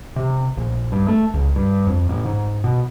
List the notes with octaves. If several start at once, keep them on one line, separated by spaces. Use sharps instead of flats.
C3
A#1
G2
A3
C#2
G2
F2
A1
G#2
B2